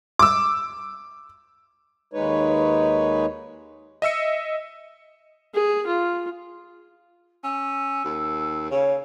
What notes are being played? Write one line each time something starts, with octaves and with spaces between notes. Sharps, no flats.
D6 E6
D#2 G#3 D#4 B4 C#5
D#5 E5 E6 C#7
G#4
F4
C#4 E6
D#2
C#3 C#5 F5